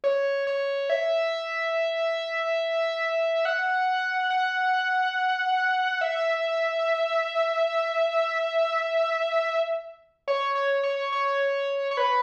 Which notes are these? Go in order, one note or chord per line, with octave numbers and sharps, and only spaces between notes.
C#5
C#5
E5
F#5
F#5
E5
C#5
C#5
C#5
C#5
C#5
B4